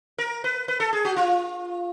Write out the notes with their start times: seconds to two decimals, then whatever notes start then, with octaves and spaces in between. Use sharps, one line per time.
0.18 A#4
0.44 B4
0.68 B4
0.80 A4
0.93 G#4
1.05 F#4
1.16 F4